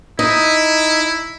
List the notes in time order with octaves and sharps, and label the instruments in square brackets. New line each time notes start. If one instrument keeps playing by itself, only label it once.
[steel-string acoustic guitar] D#4 [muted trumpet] E4